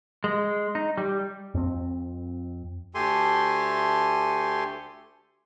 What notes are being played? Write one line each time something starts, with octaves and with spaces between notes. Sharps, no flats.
G#3
D#4
G3
F2 C4
D2 A3 G4 A4 G#5 C6